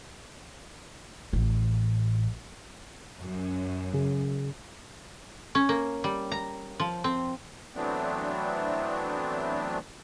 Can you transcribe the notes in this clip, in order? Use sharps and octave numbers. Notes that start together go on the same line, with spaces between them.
A1 A2
F#2
C#3 G#4
C#4
A#3
G3
A#5
F3
C4
E3 F#3 A3 B3 C4 D4